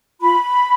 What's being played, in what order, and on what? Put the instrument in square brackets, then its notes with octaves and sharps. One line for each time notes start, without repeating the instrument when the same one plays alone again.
[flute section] F4 B5